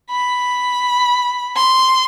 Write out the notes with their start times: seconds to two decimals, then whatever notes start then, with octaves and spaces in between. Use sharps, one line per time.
0.11 B5
1.57 C6